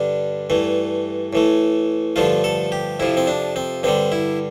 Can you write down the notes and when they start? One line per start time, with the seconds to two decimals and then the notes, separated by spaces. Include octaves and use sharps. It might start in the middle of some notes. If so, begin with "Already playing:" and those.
Already playing: G2 D3 G3 D4
0.50 G2 E3 A3
1.33 A2 E3 A3
2.16 G2 D3 F3 A3 F4
2.44 A4
2.72 G4
3.00 F2 C3 F3 E4
3.17 C4
3.27 D4
3.56 C4
3.83 G2 D3 G3 C4
4.12 E4